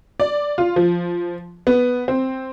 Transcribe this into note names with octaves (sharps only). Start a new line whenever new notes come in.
D5
F4
F3
B3
C4